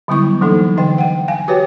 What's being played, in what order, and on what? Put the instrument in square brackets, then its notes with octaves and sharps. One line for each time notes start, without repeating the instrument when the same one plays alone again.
[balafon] D3 F#3 G3 B3 E4 C#6
E3 F#3 A#3 D4 D#4 A4
D3 E3 D#5 G5
F#5 G5
F5 G#5
F#4 G4 B4 C#5 G5